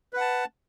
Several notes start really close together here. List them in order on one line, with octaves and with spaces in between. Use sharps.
B4 F#5 A5